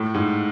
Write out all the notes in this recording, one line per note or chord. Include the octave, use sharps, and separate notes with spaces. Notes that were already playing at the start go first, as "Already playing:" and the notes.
Already playing: A2
G#2